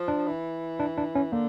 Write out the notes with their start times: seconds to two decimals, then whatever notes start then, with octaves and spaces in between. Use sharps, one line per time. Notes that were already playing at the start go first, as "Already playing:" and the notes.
Already playing: F3
0.08 D4
0.26 E3
0.79 D4
0.98 D4
1.15 C#4
1.32 D3 A#3